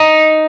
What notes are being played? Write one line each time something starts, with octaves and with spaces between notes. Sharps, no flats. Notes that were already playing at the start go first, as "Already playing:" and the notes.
Already playing: D#4